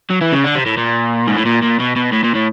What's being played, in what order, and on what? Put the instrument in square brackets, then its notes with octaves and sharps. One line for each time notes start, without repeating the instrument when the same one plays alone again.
[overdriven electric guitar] F#3
E3
C#3
D3
C3
A2
A#2
G#2
A2
A#2
A#2
B2
B2
A2
A#2
A2